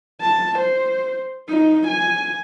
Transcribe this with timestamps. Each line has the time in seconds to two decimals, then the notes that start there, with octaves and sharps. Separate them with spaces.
0.22 A5
0.59 C5
1.49 D#4
1.87 G#5